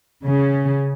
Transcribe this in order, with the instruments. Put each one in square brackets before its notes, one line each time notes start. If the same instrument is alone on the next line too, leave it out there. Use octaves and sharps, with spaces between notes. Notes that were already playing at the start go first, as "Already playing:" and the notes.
[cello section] C#3